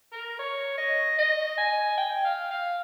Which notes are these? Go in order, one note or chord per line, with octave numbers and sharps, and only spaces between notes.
A#4
C#5
D#5
D#5
G#5
G5
F5
F5